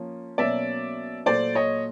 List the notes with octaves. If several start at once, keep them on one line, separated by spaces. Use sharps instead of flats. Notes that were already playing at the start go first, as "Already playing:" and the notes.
Already playing: F3 A#3 C#4
B2 F#3 A#3 C#4 D5 E5
A#2 F#3 A3 C5 D5
C#5 D#5